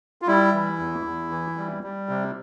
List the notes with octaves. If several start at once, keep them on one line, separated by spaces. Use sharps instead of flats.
F4
G3 E4
E3
E2
E2
E3
G3
G3
C3